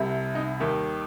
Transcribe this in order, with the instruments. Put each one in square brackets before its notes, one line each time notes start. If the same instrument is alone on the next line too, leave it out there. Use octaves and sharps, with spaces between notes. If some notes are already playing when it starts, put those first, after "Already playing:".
Already playing: [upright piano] C2 C3 G3
D#4
D#2 D#3 G3